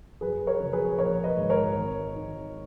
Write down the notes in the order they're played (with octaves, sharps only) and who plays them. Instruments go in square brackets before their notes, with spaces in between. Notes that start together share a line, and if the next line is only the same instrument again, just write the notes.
[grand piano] F#1 G#4 B4
A#4 C#5
F2 C#3
G#4 B4
A#1 A#4 C#5
B4 D#5
G#2 D#3
A#4 C#5
G#1
D#3